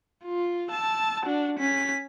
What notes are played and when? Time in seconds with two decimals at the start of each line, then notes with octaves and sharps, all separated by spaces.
0.25 F4
0.71 A5 E6
1.26 D4 F#4
1.59 C#4 B6